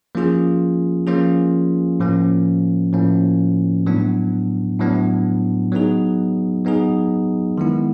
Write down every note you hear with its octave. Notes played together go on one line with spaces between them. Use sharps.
F3 A#3 C#4 F4 G#4
F3 A#3 C#4 F4 G#4
A2 F3 A#3 C#4
A2 F3 A#3 C#4
A2 F#3 B3 D4
A2 F#3 B3 D4
F#3 B3 D#4 G#4
F#3 B3 D#4 G#4
D#3 G#3 B3 E4